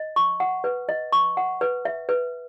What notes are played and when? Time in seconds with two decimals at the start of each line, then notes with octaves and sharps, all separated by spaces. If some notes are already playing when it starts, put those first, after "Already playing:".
Already playing: D#5
0.16 C#6
0.40 F#5
0.64 B4
0.89 D#5
1.12 C#6
1.37 F#5
1.61 B4
1.85 E5
2.09 B4